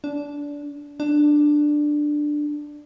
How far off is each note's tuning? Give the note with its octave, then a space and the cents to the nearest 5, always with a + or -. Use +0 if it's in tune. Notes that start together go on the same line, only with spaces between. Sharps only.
D4 -20
D4 +10